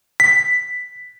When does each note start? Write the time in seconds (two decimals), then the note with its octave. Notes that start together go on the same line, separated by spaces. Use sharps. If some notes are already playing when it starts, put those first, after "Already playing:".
0.20 B6